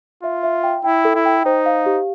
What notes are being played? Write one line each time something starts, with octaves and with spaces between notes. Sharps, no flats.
F4 E5
E5
G5
E4 G5
A4
E4
G5
D#4 C5
F5
G4